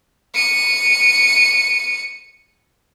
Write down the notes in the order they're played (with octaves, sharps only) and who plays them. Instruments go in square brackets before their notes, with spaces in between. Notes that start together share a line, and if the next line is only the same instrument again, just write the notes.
[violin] C#7 D#7